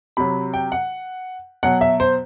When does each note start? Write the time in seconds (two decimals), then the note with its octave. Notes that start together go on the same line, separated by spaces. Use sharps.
0.17 C3 F#3 B5
0.54 G5
0.72 F#5
1.63 B2 F#3 F#5
1.81 E5
2.00 C5